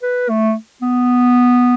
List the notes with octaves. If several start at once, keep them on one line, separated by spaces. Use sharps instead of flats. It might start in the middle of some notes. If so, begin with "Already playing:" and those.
B4
A3
B3